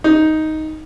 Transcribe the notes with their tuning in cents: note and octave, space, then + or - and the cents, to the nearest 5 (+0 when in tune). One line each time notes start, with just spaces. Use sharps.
D#4 +5